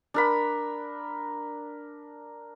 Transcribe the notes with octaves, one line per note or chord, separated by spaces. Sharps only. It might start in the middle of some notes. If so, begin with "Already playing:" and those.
D4 A#4 B5